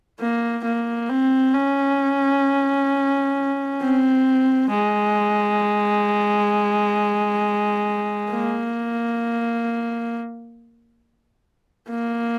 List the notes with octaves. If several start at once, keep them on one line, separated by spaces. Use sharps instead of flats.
A#3
A#3
C4
C#4
C4
G#3
A#3
A#3